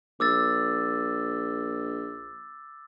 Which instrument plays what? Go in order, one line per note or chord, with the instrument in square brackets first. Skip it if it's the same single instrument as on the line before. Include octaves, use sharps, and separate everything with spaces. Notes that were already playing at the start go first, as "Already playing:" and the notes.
[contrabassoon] A#1 [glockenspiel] D6 E6 A6